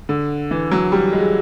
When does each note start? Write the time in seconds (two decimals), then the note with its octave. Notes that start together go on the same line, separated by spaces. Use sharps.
0.09 D3
0.51 E3
0.72 F#3
0.92 G3
1.13 G#3